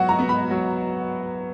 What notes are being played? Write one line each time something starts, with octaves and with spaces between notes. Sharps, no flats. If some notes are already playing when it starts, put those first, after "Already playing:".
Already playing: F#3 B3 F#4 F#5
A#5
B3
B5
F#3